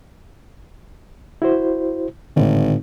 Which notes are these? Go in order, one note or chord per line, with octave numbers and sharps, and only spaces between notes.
E4 F#4 C5
G#1 A2 D3